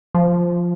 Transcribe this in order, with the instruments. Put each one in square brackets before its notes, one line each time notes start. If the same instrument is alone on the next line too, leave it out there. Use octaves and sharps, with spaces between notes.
[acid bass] F3